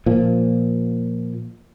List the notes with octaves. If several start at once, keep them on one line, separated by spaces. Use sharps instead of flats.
A#2 F3